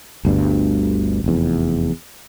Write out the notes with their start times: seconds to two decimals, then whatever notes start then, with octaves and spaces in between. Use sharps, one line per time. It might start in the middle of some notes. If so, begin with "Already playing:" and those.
0.25 G1 D2 G2
1.24 F1 E2